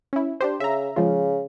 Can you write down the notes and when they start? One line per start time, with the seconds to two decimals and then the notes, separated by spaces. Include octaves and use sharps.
0.13 C#4 E4
0.40 D4 G4 C5
0.60 C#3 E5 A#5
0.96 C#3 F3 G#3 F4